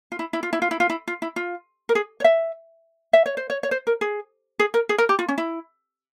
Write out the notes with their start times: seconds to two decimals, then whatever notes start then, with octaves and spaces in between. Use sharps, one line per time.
0.12 F4
0.19 E4
0.33 E4
0.43 F4
0.53 E4
0.62 F4
0.71 E4
0.80 F4
0.90 E4
1.08 F4
1.22 E4
1.36 F4
1.89 A#4
1.95 G#4
2.20 C#5
2.24 E5
3.13 E5
3.26 C#5
3.37 C5
3.50 C#5
3.63 C#5
3.71 C5
3.87 A#4
4.01 G#4
4.59 G#4
4.74 A#4
4.89 G#4
4.98 A#4
5.09 G4
5.19 F4
5.28 C#4
5.38 E4